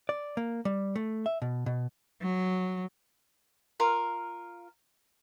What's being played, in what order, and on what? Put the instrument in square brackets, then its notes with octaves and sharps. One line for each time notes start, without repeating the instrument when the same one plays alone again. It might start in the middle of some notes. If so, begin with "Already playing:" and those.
[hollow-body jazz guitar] D5
A#3
G3
A3
E5
B2
B2
[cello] F#3
[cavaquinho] F4 A#4 F5